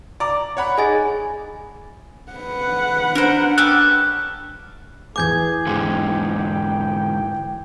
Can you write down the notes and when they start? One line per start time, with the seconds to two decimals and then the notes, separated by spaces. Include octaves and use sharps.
0.20 D5 A#5 D6
0.57 C#5 F#5 B5
0.78 D#4 G#4 G#5 A6
2.32 B4 F#5
3.15 D4 A#4 C5
3.58 C#4 G4 A4 F#6
5.16 E2 G#4 G#5 D6 G6 G#6
5.67 G#2 D3 E3 G5